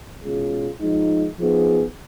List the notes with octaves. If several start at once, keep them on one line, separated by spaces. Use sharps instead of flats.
B2 G#3 C#4 F4 G#4
F3 G#3 D#4
F3 B3 D#4 G#4